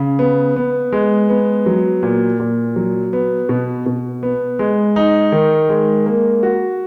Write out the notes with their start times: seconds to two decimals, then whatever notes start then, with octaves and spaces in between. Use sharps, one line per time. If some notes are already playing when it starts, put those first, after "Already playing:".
Already playing: C#3
0.19 B3
0.56 B3
0.92 G#3
1.29 B3
1.66 F#3
2.03 A#2
2.40 A#2
2.76 F#3
3.13 B3
3.49 B2
3.86 B2
4.23 B3
4.59 G#3
4.96 D#4
5.32 D#3
5.69 G#3
6.06 A#3
6.43 F#4